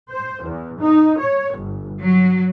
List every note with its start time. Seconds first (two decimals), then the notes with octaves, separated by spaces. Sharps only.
0.12 C5
0.44 E2
0.81 D#4
1.19 C#5
1.57 G1
2.01 F#3